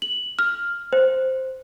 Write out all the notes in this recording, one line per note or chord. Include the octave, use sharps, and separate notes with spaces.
F#7
F6
C5